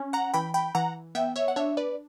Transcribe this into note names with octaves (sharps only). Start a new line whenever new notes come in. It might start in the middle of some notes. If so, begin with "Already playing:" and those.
Already playing: C#4
F#5 A#5
E3 G5 B5
G5 B5
E3 F#5 A#5
B3 E5 G5
C#5 E5
F#5
D4 C#5 E5
B4 D5